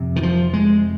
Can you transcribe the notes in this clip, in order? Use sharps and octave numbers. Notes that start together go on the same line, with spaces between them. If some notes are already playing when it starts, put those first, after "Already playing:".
Already playing: F2 C3
D#3
F3
G#3